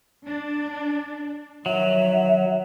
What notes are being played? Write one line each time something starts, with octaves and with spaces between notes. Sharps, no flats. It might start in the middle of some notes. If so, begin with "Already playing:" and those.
D4
D#3 F3 F#3 E5